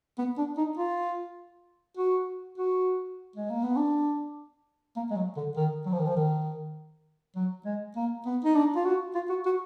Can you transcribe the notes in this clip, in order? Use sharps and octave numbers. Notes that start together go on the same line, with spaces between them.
B3
D4
D#4
F4
F#4
F#4
G#3
A#3
B3
D4
A#3
G#3
F#3
D3
D#3
F#3
F3
D#3
F3
D#3
F#3
G#3
A#3
B3
D#4
D4
F4
F#4
F4
F#4
F#4